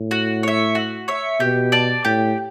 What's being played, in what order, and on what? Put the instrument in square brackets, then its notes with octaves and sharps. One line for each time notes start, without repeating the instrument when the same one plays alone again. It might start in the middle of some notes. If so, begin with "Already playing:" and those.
Already playing: [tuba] A2
[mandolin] F#4
C#5 E5
F#4
C#5 E5
[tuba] B2 [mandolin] G4
[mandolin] D5 A5
[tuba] A2 [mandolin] G4